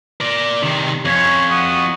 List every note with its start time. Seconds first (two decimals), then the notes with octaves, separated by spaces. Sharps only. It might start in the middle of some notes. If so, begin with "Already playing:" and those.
0.20 A#4 D5
0.62 C3 D#3
1.05 F2 C#4 C#5
1.50 F#4 C#6 D#6